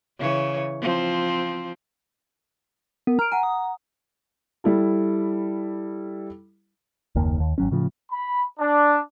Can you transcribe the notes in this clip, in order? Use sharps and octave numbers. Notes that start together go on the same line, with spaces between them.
C#3 E3 C#5
F3 C4
B3 A#4
A#5 F6 D7
F#5 G#5 A#5
D#6
G3 E4 A4
F#1 D#2 D#3 A#3
D#2
G#1 F#3 C#4
A2 C#3 F3
B5
D4